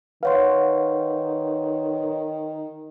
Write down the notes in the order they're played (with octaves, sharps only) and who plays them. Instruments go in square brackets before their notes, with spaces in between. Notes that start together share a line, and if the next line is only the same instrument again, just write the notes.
[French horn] D#3 [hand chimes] B4 C#5 C6 [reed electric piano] F5 F#5